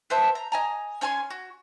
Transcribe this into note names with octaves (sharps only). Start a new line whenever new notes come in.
B4 C5 E5 A5
A#5
D#5 G#5 A#5
C#4 C#5 G#5 C6
F#4